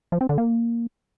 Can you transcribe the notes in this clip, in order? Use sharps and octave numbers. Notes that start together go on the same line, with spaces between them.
F3
C4
D3
A#3